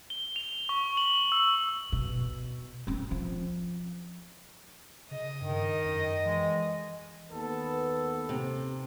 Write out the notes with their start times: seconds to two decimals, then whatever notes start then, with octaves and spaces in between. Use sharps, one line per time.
0.10 G7
0.36 F7
0.69 C#6
0.97 F#7
1.32 E6
1.92 B2
2.87 C4 C#4
3.11 F3
5.11 C#3 D#5
5.41 G2 D#3
5.86 F#2
6.26 E3 G#3
7.32 D#2 B3 A4
8.29 C3